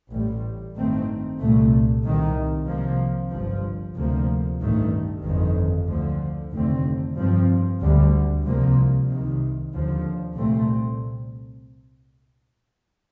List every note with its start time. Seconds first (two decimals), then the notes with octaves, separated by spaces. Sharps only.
0.10 A1 A2 G3
0.74 A1 G2 D#3 A3 C4
1.39 C2 A#2 A3
2.03 C2 C3 D#3
2.68 C2 C3 F3 A#3
3.31 G1 G2 F3
3.95 D2 C3 F3 A#3
4.60 A1 G2 D#3 A3
5.23 G1 F2 D#3
5.87 D2 D3 F3
6.52 F1 D#2 D3 A3 C4
7.15 G2 F3 C4
7.79 D2 D3 G3
8.44 C2 C3 F3 A#3
9.08 C2 C3 D#3
9.73 D#2 D3 F3
10.36 C2 A#2 A3 C4